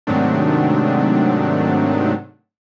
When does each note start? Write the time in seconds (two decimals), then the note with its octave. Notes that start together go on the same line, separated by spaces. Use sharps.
0.07 G#2 C3 D#3 F#3 A3 D4